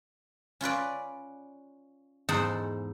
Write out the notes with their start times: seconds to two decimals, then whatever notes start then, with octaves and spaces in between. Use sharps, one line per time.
0.61 C#4 F4 B4 D5
2.29 E2 G#2 D#4 A4 C5 F#5